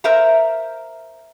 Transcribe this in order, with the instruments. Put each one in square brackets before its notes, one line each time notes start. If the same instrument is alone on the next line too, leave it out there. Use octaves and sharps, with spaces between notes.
[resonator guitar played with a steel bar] A#4 C5 E5 F5 A#5